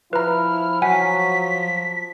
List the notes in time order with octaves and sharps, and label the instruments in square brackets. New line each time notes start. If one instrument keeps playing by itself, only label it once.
[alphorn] F3 [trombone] E4 [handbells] B4 A#5 [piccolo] F6
[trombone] F#3 [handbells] F#5 G#5 [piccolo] B6